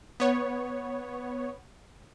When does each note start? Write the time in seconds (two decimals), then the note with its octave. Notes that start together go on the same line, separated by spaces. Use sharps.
0.20 B3 C#5